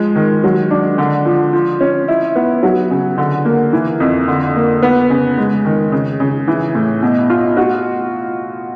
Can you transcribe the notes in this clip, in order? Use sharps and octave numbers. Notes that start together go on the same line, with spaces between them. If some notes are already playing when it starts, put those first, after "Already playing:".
Already playing: F3 G#3
D#3
F#3
D4
D3
F3
F3
C#4
E4
B3
F#3
C#3
D3
A#3
E3
F2
D3
A#3
B3
C#3
G#3
D#3
C#3
C#3
E3
A2
B2
F4
F#4